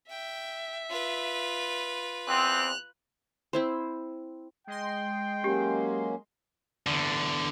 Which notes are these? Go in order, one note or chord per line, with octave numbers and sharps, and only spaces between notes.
E5 G5
F4 B4
E2 C4 F#6 F7
C4 E4 C5
G#3 D#5 G5 C6
F#3 A#3 C#4 G4
E2 D3